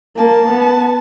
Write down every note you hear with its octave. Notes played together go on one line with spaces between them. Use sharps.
A#3 A5
B3